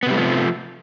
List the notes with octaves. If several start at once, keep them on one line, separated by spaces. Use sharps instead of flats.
C3 F3 G3 A3 B3